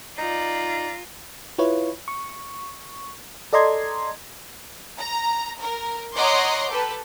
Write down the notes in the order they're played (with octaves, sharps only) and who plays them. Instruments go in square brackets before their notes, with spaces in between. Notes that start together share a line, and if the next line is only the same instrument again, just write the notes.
[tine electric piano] D#4 [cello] F4 [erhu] D5 [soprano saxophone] A#5
[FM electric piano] E4 F4 B4 C#5
C#6
A4 D5 D#5 A#5 C6 G#6
[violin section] A#5
A#4
C#5 D#5 F#5 A#5 C6 D6
G4 A4 B4